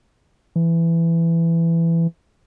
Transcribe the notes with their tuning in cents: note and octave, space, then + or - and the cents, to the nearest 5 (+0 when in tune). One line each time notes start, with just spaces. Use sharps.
E3 +15